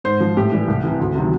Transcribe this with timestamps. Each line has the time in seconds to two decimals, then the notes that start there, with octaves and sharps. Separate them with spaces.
0.04 G#2 C5
0.20 F3
0.36 A2 G4
0.52 E3 G3
0.68 C2
0.84 C3 E3
1.00 D2
1.15 C3 D#3 F#3